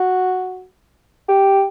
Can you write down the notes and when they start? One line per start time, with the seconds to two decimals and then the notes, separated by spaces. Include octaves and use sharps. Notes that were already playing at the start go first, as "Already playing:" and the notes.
Already playing: F#4
1.29 G4